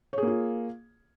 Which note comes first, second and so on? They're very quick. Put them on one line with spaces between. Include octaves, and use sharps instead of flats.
C#5 G#4 A#3 F4